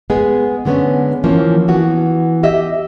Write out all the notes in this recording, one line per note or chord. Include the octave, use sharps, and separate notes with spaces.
G#3 B3 G#4
D3 G#3 B3 C#4
E3 F3 A#3 C#4
E3 B3 F#4
G4 D#5 E5